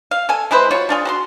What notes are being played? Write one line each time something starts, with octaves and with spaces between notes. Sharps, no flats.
F5
A4 G#5
G#3 E4 B4 C5
F4 F#4 C#5
D4 F4 G#4
F#4 A#5 C6